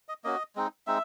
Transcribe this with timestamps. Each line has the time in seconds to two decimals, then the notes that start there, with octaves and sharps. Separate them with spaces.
0.09 D#5
0.24 A#3 C#4 F#4 D#5
0.55 G#3 C4 D#4
0.87 G#3 C4 D#4 E5